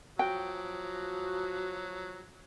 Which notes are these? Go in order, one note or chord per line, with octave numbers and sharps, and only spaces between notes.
F3 F#3 F#4 G5